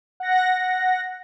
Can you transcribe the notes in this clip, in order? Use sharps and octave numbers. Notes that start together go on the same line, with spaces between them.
F#5 A#6